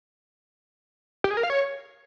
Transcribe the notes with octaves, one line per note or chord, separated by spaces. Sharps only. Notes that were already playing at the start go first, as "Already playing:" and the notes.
G4
G#4
A#4
F5
C#5